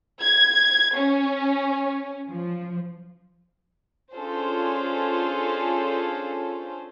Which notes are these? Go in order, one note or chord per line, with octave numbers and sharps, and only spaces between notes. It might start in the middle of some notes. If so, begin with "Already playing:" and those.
G#6
C#4
F3
C#4 D4 F4 G#4 A4 C5